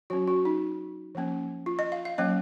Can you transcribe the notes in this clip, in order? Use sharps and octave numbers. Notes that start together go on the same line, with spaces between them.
F#3 C#4 F#4
F#4
D#4
F3 A#3 C#4
F4
D#5
F5
F5
F#3 A#3 C#4 D#5